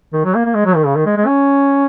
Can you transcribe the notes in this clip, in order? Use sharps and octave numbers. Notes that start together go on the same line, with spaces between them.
D#3
F#3
A#3
A#3
G#3
F#3
D#3
C#3
D#3
G#3
G#3
C#4